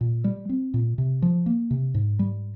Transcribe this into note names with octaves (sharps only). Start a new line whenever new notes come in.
A#2
G3
C4
A#2
C3
F3
A#3
C3
G#2
G3